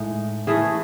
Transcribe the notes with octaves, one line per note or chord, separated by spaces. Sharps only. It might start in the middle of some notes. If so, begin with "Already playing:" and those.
Already playing: A2 G#3 D#4
E3 A3 C#4 G#4